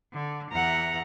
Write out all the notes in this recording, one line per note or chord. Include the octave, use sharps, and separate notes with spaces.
D3
E2 E5 F#5 A#5